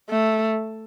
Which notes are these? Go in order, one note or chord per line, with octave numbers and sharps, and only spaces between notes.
A3